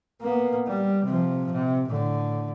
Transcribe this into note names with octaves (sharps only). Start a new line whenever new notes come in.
A#3 B3
G3
C3 F3
C3
A2 D3